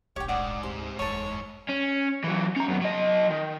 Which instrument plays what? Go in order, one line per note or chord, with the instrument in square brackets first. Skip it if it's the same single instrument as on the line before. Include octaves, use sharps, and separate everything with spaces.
[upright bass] D1 A#1 [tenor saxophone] G4 [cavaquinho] C#5 G5
[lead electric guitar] G#2 [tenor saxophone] D5 [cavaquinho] F#5 G5 D#6
[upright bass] D2 B3 [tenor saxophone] C3 [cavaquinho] C6
[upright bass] F#1 E2 [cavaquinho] A4 G#5 [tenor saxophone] C#5
[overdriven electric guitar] C#4
E3 F#3
C#4 A#5
F#2 B3
F#3 D#5
D#3